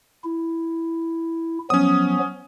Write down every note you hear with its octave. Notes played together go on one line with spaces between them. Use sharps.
E4
F3 F#3 B3 C#4 D#6